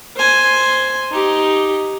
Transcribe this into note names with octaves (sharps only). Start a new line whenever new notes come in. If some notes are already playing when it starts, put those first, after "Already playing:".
C5 G#5
D#4 G4